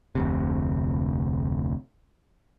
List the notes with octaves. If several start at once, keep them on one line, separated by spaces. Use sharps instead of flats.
F1 D2 C3